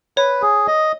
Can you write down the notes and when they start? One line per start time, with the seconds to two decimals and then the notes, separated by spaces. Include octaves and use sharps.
0.17 B4 C#5
0.42 G#4
0.67 D#5